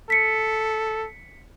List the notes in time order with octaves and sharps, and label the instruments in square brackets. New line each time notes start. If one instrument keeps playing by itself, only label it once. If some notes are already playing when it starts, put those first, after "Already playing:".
[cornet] A4 [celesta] B6 C#7